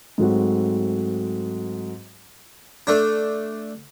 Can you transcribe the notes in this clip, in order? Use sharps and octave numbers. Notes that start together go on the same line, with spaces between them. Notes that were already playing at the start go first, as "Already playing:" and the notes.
G#2 F#3 A3 C4 F#4
A3 D4